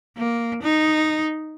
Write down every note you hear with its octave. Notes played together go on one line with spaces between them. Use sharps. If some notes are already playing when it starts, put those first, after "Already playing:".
A#3
D#4